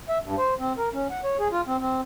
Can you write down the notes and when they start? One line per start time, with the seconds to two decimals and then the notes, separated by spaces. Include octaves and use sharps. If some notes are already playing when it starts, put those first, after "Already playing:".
0.09 E5
0.24 G2
0.38 C5
0.59 C4
0.78 A#4
0.93 C#4
1.10 F#5
1.24 C#5
1.39 G#4
1.52 F4
1.67 C4
1.80 C4